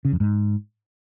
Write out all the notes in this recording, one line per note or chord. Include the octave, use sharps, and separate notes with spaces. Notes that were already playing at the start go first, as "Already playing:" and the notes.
C#3
F2
G#2